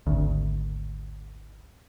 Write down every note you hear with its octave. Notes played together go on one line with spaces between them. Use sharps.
G#1 D2